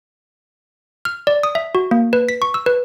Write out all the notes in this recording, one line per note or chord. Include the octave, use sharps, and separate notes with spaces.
F6
D5
D#6
E5
F#4
A#3
B4
B6
C#6
E6
B4